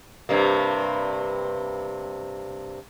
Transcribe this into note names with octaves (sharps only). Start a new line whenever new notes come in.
G2 C3 A#3